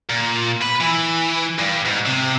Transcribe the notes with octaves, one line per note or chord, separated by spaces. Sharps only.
A#2
B4
E3
G2
G#2
C3